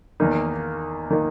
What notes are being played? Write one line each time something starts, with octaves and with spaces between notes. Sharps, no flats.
E2 D#3 A#3 D#4
D#3 A#3 D#4